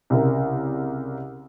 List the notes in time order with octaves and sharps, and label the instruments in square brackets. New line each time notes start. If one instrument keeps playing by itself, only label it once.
[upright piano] C2 C#3 A#4